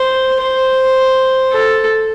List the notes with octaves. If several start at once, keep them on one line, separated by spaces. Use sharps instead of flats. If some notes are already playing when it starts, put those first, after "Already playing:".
Already playing: C5
C5
A4